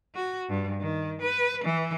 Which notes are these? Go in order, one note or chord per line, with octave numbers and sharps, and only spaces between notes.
F#4
G2
D#3
B4
E3